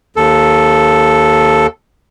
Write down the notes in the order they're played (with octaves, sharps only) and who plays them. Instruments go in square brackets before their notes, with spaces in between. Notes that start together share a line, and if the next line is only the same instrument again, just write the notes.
[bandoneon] D#2 A4